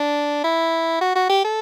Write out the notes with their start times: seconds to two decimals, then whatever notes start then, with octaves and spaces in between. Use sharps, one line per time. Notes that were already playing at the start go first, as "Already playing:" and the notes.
Already playing: D4
0.44 E4
1.01 F#4
1.15 F#4
1.29 G4
1.45 A4